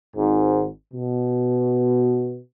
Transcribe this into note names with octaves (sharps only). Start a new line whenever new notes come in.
G#1 G#2
B2